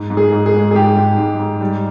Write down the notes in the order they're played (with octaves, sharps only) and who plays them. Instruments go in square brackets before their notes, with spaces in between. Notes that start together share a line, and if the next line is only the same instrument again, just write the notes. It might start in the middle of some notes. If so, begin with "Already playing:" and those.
Already playing: [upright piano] G#2
G#2
[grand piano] G#4
[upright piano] G#2
[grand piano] G#4
[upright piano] G#3
[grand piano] G#4
[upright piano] G#2 [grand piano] G4
[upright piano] G#2
G#2
G#2
G3